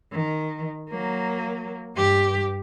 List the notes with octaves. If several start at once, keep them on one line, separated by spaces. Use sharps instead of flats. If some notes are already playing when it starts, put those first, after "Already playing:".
D#3
F#3 A#3
G2 G4